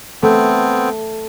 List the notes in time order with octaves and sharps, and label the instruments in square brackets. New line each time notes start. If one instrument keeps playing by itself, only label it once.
[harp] A3 [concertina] B3 C4